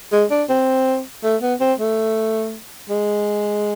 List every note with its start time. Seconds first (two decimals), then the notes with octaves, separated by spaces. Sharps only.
0.12 G#3
0.31 D4
0.49 C4
1.24 A3
1.42 B3
1.60 C4
1.79 A3
2.90 G#3